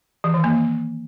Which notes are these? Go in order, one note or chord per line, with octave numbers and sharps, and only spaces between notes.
E3
D#3
A#3